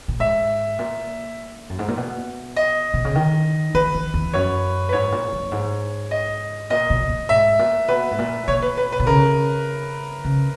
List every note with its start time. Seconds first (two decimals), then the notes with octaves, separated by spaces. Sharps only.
0.08 A#2
0.19 G#2 E5
0.79 A#2
1.70 F#2
1.79 G#2
1.88 A#2
1.97 B2
2.56 D#5
2.94 B2
3.05 C#3
3.15 D#3
3.74 D#3 B4
3.94 D#3
4.14 E2
4.33 F#2 C#5
4.89 B4
4.93 G#2 C#5
5.12 A#2
5.33 F#2
5.52 G#2
6.11 D#5
6.70 A#2 D#5
6.90 B2
7.10 B2
7.29 G#2 E5
7.59 A#2
7.88 B2 B4
8.11 G#2
8.19 A#2
8.48 B2 C#5
8.62 B4
8.77 B4
8.92 B4
9.00 B2
9.07 C#3 A#4
10.25 C#3